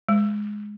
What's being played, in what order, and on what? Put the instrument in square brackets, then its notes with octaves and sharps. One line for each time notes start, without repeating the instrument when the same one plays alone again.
[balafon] G#3